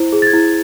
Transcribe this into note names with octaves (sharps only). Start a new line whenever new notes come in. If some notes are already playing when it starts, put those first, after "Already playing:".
Already playing: E4 C5
G#4
A6
G#6
E4